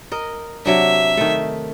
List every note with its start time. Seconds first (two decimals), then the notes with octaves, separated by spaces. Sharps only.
0.12 A#4 D#5
0.65 C3 F#3 D4 E5
1.17 D#3 A3